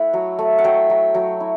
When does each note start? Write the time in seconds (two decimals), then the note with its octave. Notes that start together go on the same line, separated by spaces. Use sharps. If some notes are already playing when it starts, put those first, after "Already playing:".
Already playing: A3 E4 F#5
0.14 F#3
0.39 A3
0.58 F#5
0.64 F#3 G5
0.90 F#3
1.14 F#3
1.40 E4